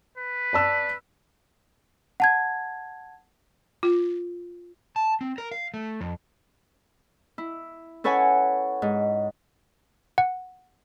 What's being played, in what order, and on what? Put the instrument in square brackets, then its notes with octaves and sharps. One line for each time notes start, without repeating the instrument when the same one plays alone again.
[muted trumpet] B4
[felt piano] D5 A5 E6
[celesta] F#5 A5 G#6
[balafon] F4
[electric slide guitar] A5
C4
A#4
F5
A3
F2
[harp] E4
C#4 A4 B4 C#5 F#5 G#5
G#2
[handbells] F#5